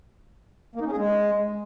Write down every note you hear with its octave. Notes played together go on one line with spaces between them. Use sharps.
A#3
D#4
C#4
G#4
G#3